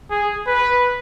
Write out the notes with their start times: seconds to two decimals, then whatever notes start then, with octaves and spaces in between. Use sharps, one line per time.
0.10 G#4
0.47 B4